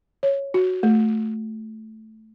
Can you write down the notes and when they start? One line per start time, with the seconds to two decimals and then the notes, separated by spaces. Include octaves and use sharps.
0.23 C#5
0.54 F#4
0.83 A3